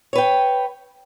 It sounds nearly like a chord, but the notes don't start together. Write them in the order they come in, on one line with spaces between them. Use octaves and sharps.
C#5 B4 G5